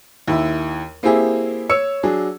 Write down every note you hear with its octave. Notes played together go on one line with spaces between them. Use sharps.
D#2 E4
A#3 C4 E4 G4 G#4
C#5 E6 C#7
F#3 D4 G#4